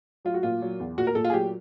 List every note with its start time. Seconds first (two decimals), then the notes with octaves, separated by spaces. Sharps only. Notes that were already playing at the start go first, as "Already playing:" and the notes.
0.25 F#3 F4
0.34 F#4
0.43 A#2 F4
0.62 F#3
0.80 E2
0.98 A#2 F#4
1.07 A#4
1.15 A#2 A4
1.24 F4
1.30 G#4
1.33 F#3 G4